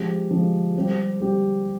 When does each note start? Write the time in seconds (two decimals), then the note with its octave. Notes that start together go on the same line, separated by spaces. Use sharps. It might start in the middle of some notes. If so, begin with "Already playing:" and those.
Already playing: F3 G#3 C4 G4
0.31 F3 G#3 C4 G4
0.76 G3 C4 G4
1.20 G3 C4 G4